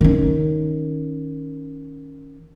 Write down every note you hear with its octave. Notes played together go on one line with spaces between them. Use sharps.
D#3 C#4